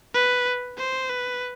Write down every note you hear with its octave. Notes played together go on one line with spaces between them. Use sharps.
B4
C5
B4